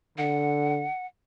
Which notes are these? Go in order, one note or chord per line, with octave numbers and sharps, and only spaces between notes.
D3 F#5